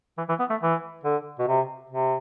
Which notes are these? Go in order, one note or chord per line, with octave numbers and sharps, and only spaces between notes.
E3
E3
B3
A3
E3
D3
B2
C3
C3